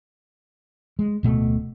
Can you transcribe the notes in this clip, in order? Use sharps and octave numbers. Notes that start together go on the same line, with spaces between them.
G#3
D1 B2 A3